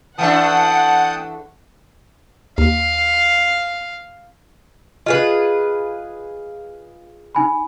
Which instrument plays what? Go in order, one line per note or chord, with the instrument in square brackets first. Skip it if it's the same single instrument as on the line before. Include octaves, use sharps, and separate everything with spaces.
[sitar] E3 A3 D4 [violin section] F#5 [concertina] G5 A5 D#6
[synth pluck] D#2 [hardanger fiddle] F5
[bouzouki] F4 G#4 B4 [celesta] D#5
[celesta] D#4 G#5 B5